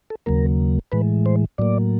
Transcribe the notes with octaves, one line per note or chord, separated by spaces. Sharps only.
A4
D#2 C#3 F#3 A#3 A#4
A2 E3 G#3 B4
C5
A2 F#3 A#3 D5